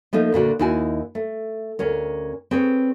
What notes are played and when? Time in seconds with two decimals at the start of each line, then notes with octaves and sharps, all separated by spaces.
0.13 F3 A3 A#3 D#4
0.32 D2 A#2 D3 F#4
0.59 D#2 D#4 E4 F#4 G#5
1.15 A3
1.79 D2 C#4 A#4
2.51 C4 G#4 B4 C#5